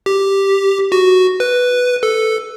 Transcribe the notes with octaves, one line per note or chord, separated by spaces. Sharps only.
G4
F#4
B4
A4